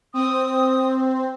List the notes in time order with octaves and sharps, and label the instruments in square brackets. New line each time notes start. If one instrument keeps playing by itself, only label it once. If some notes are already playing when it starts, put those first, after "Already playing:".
[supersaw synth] C4 [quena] D#6